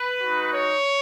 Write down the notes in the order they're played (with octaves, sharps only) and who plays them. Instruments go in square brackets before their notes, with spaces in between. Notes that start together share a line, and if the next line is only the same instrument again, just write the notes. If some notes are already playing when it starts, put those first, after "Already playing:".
Already playing: [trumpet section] B4
G#3 D#4 F#4
C#5